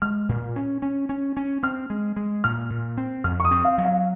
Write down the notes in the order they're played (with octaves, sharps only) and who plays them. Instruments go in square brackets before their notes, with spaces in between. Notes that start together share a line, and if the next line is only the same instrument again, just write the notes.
[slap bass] G#3 [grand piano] F6
[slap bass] A#2
C#4
C#4
C#4
C#4
[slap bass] C4 [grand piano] F6
[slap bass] G#3
G#3
[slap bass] A#2 [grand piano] F6
[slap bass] A#2
C4
[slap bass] F2 [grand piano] F6
[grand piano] C#6
D#6
[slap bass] C4
[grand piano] F5
[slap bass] F#3
[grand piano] F5